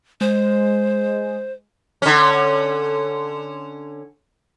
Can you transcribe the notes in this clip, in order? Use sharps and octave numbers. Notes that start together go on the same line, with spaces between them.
G#3 C5
D3 C#4